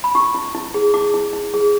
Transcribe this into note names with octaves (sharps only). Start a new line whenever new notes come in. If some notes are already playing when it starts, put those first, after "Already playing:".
B5
E4 C#6
E4
E4
G#4
E4 D6
E4
E4
G#4